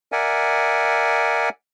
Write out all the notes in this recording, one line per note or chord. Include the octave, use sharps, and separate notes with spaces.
A#4 D5 E5 F#5 G#5